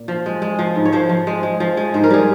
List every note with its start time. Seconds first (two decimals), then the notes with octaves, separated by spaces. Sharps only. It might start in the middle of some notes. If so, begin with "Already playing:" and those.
Already playing: A#2
0.08 F3
0.26 G#3
0.42 G#3
0.59 F3
0.76 G#2
0.85 C#5
0.92 F3 C5
1.09 F3
1.27 G#3
1.43 G#3
1.60 F3
1.77 G#3
1.94 G#2 C5
2.03 A#4
2.10 G3 G#4